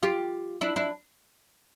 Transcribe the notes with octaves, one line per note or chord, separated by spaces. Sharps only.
F4 G4
D4 E4
D4 E4